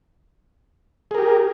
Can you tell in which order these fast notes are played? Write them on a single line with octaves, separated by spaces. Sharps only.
G#4 A#4 G4